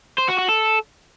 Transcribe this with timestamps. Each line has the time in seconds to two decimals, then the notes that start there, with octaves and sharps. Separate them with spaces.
0.18 C5
0.28 F#4
0.38 F#4
0.49 A4